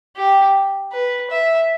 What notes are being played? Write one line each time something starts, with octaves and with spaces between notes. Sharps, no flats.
G4
B4
E5